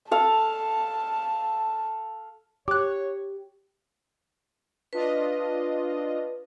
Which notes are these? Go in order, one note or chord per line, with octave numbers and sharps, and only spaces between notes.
A4 F5 A5
G4 C#5 D6 F#6
D4 F4 B4 D#5